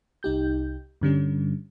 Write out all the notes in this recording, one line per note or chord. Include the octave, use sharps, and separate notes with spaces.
C2 D#4 G4 G6
G2 D3 G3 C#4